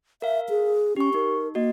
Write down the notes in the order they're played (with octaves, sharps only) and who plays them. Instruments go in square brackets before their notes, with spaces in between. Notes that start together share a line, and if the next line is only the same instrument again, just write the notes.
[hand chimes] A#4 F5 [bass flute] E5
[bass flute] G#4
[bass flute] C#4 [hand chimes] G4 C#6
[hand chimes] D#4 [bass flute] A#4
[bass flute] A#3 [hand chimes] F#4 D#5